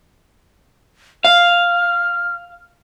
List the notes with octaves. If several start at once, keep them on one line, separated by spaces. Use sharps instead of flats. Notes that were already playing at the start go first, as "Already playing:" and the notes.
F5 F6